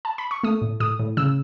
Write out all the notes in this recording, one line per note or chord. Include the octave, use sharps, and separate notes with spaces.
A5
B5
C#6
A3 D#6
A2
A2 D#6
A2
C#3 E6